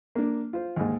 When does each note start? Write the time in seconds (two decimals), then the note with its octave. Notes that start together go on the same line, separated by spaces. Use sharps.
0.15 A#3 D4
0.53 F4 C5
0.76 D#2 G#2